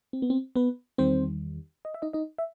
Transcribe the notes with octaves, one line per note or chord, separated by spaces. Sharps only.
C4
B3
C4
B3 B4
E2 D#3 G3 C4 C5
D#5
E5
D#4 D#5
D#4 D#5
E5